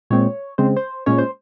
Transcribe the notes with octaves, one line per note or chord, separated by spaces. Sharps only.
A#2 G#3 C4 C#5
C#3 G#3 C4 C5
C5
A#2 G#3 C#4 C#5
C5